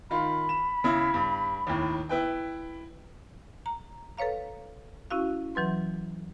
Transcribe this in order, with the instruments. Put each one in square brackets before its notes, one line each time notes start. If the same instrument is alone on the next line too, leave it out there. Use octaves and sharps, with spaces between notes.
[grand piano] D#3 F4 [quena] B5
[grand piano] E7
C#3 E4
G2
D#2 A2
E4 B4 G5
[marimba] A#5
A4 B4 C#5 F5 A#5
C#4 E4 F#4 F5
E3 F#3 B4 C6